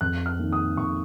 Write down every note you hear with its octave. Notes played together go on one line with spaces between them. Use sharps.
F2 F#6
F6
D#3 A#3
D#6
F2 C#6